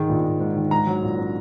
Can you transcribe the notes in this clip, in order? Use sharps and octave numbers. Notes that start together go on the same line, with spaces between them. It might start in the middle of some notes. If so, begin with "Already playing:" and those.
Already playing: G#2 D#3 G#3
A#1
A#1
G#2
D#3
G#2 A#5
F#3
A#1
C#4